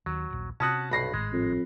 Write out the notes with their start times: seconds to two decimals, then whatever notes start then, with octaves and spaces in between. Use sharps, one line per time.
0.06 D#2 F#3
0.31 D#1 A#1
0.60 C3 C#4 F#4 A5 D#6 F#6
0.91 B1 G2 B5 A#6 C7
1.14 G#1 A2 G#3
1.33 F2